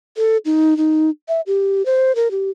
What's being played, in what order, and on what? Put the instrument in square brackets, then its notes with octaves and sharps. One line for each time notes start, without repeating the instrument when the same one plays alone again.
[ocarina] A4
D#4
D#4
E5
G4
C5
A#4
G4